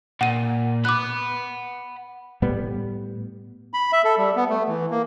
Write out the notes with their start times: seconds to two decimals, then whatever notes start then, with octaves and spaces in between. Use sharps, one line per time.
0.21 A#2 F#5 D#7
0.85 F#5 B5 D6 F#6
2.42 A2 G3 B3
3.73 B5
3.92 E5
4.04 A4
4.18 G3
4.36 B3
4.50 A3
4.68 E3
4.91 A#3